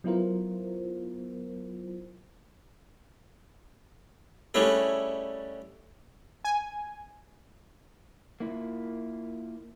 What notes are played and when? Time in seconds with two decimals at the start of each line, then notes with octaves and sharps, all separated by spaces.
0.04 F#3 B3 E4 F4 A#4 C5
4.54 G3 A3 C#4 D4 E4 G#4
6.45 G#5
8.40 A#3 E4 F4